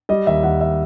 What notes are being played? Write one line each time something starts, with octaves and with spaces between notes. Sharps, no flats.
G3 D#5
D#2 E5
D#2 F#5
E5